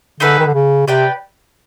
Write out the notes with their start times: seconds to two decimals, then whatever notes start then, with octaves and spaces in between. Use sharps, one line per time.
0.20 D3 D#4 G#4 B4 E5
0.39 D#3
0.47 D3
0.54 C#3
0.87 C3 G4 B4 D5 G5